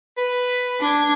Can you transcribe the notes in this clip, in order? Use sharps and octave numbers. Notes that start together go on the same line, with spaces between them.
B4
D4 G#6